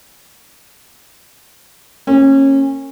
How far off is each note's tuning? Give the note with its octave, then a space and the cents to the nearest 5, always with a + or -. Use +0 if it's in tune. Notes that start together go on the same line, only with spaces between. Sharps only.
A#3 -30 C#4 -25